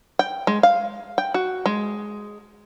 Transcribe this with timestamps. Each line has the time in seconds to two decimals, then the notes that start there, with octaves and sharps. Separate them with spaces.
0.19 G5
0.47 G#3
0.63 F5
1.18 G5
1.34 F#4
1.66 G#3